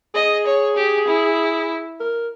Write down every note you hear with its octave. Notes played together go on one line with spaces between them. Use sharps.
G#4 D#5
C#5
G4
E4
A#4